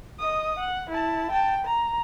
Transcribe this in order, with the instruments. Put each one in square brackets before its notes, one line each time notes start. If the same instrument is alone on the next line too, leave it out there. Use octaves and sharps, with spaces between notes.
[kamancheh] D#5 D#6
F#5
E4 A5
G5 A5
A#5